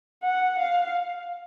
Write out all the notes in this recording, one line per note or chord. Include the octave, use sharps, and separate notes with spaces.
F#5
F5